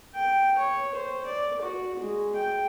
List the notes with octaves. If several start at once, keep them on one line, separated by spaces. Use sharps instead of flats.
G5
C#5
C5
D5
F#4
G#3
G5